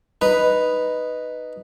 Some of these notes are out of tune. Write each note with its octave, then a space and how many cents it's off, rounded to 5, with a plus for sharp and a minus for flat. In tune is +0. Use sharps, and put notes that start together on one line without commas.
D#4 -5 B4 +0